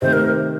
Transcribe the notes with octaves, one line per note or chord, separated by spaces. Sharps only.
C3 D#3 A3 C5
A#4